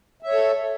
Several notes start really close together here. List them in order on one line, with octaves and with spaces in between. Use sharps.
E5 C#5 A4